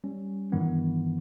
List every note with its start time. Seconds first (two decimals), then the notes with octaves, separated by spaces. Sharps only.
0.04 G3 C#4
0.52 G2 D#3 E3 B3